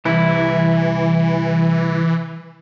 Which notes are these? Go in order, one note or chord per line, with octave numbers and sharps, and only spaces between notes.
C2 E3 E4